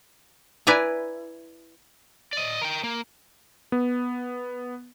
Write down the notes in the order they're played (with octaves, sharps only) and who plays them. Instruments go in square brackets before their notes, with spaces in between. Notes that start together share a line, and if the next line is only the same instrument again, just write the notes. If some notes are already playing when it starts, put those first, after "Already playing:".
[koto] E4 B4 D5 G#5 A#5
[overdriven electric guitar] D5 D#5
A#4 G5
A#3
[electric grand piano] B3